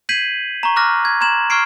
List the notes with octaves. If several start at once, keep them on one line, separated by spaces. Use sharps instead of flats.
G6 G#6 B6 C7 D#7 F#7
A#5 C#6
C#6 D6 F6 F#6 A#6
G#6
A#5 C6 G#6 E7 F#7
C#6 F6 G#6 C7 D7